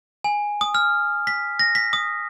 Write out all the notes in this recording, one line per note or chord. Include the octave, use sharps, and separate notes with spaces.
G#5
D#6
F6
B6
A#6
B6
D#6